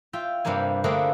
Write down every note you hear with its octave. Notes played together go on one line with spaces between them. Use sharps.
F4 E5 G5
G2 C3 G3 A#3 G#5
D3 A3 A#3 C4 G#4 B4